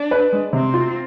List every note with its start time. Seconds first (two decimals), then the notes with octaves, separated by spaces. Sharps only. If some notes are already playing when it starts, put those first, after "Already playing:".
Already playing: D4
0.11 B4
0.32 G#3
0.53 C3 C4
0.74 F4